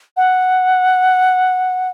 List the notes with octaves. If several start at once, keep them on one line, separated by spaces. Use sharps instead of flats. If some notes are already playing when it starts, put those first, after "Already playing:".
F#5